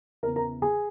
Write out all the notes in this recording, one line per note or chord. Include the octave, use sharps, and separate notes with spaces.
E2 C#3 E3 A#4 A#5
A#4 A#5
G#4 G#5